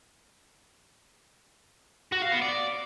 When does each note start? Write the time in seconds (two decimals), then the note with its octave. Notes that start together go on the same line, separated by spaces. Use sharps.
2.12 F#4
2.22 F5
2.32 B3
2.42 D5